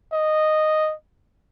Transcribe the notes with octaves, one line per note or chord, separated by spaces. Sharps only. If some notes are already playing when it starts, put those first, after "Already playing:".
D#5